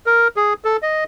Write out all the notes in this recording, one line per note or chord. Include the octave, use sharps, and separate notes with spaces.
A#4
G#4
A4
D#5